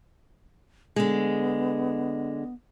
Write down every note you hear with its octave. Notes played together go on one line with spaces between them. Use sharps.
D3 G#3 B3